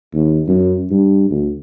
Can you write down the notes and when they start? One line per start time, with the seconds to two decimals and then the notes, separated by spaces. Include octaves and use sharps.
0.13 D#2
0.48 F#2
0.90 G2
1.30 D2